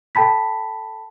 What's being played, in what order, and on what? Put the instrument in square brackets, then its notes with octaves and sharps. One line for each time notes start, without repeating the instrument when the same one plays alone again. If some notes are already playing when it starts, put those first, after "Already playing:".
[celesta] A4 G5 A5 B5 B6